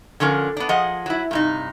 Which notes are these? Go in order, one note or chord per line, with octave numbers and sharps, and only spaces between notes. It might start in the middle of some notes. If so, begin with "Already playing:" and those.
D3 F3 C#4 A#4
B3 D4
F3 G#4 D#5 F#5
F#3 E4
G2 C3 D#4